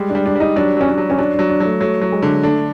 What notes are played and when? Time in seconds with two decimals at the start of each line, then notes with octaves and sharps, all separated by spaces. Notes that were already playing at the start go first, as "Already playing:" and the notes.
Already playing: G3 G#3
0.10 D4
0.15 G3
0.26 D4
0.35 G3 D#4
0.56 F#3 D4
0.77 F#3 C#4
0.88 D4
0.98 F#3
1.10 C#4
1.19 F#3 D4
1.34 F#3 D4
1.50 D4
1.60 F#3 A3
1.81 F#3 A3
2.02 F#3
2.12 G#3
2.22 D3
2.43 A3 D4